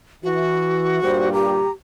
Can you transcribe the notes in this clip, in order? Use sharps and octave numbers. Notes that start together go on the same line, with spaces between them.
E3 F#4
G2 A#2 G3 C5
G4 A#5